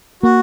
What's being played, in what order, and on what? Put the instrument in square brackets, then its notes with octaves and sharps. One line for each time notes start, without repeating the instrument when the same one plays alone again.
[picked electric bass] A#3 [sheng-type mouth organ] F#4